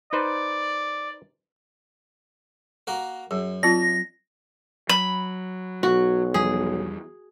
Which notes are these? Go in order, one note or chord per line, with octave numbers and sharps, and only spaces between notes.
D#4 B4 C5 D5
A#3 F#4 A#4
F#2 G#4
F#3 C4 F4 A#6
F#3 B5
B1 F#4
E2 F3 G3 G#4